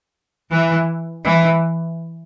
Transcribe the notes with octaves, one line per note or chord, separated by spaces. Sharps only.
E3
E3